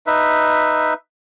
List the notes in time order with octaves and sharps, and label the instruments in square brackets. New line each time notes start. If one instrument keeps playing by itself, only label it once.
[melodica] D#4 B4 E5